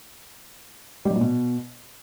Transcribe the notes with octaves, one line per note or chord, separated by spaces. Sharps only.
G3
F#3
A#2
B2